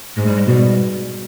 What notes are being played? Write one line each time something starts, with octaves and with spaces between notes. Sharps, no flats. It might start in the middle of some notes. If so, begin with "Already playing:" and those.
G#2 G#3
G3
G#3
B2 G3